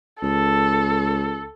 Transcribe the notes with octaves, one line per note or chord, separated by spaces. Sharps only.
C#2 A4